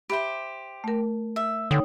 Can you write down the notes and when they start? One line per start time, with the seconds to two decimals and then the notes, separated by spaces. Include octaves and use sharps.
0.10 G4 C5 E5 B5
0.84 A3 A#4
1.36 E5
1.71 D3 D#4 C#5 G5